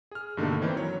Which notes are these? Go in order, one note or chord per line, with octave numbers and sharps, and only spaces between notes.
G#4 F6
G2 B2 D3 D#3 A3 A#3
D#3 E3 C4
F#3 C#5